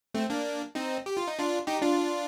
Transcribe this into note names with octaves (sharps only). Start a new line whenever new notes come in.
A3 C4
A#3 D4
C4 D#4
G4
F4
D#4
D4 F4
D#4 G4
D4 F4